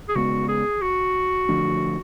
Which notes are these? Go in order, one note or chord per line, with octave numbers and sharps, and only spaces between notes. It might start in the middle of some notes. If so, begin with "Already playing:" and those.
G#4
C#3 G#3 B3 F#4
G#4
F#4
D3 F3 A3 D4